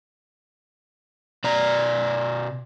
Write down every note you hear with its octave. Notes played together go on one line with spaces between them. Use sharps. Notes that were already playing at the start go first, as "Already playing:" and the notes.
B2 D5 A#5